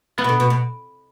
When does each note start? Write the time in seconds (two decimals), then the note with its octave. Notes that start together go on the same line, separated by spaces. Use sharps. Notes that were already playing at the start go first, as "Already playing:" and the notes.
0.18 E3 B3
0.24 B2
0.29 D3
0.40 B2
0.50 B2